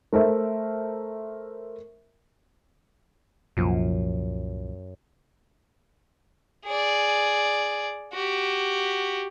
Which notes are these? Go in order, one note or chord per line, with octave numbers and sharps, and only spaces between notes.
A3 A#4 C5 E5
C2 F#2 A#2 F3
G#4 D5
F#4 G4